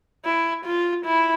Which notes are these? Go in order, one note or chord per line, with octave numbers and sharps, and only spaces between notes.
E4
F4
E4